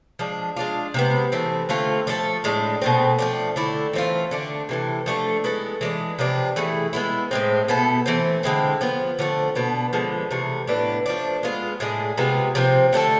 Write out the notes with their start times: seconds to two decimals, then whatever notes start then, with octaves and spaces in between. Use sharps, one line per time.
0.19 F3 G#3 D4
0.56 G#3 D4 F4
0.94 C3 G#3 B3
1.32 E3 A3 C4
1.69 D3 A3 C4 F4
2.07 F3 A3 D4 A4
2.44 A2 G#3 D4
2.82 B2 A3 C4
3.19 F3 A3 D4
3.56 D3 A3 E4
3.93 E3 A3 C4 F4
4.31 D3 A3 D4
4.69 C3 E3 A3
5.06 F3 A3 D4 A4
5.44 G#3 B3 E4 A4
5.81 E3 G#3 D4
6.19 C3 F3 B3 D4
6.56 E3 A3 E4 G#4
6.93 G#3 B3 E4
7.31 A2 G#3 C4
7.68 B2 B3 E4 A4
8.06 E3 A3 C4
8.43 D3 G#3 C4 E4
8.81 F3 B3 F4
9.19 D3 F3 A3
9.55 B2 B3 D4
9.93 D3 F3 G#3 B3
10.31 C3 E3 A3
10.67 A2 E3 B3 D4
11.06 F3 A3 D4
11.43 G#3 B3 F4
11.80 A2 G#3 D4 G#4
12.18 C3 G#3 B3 F4
12.55 C3 F3 A3 C4
12.93 D3 A3 D4 A4